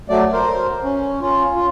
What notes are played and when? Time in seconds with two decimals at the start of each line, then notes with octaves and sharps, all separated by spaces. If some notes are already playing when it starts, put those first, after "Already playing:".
0.09 F#3 A3 D5
0.33 A#4 C5
0.83 C#4
1.21 C#4 F4
1.55 F4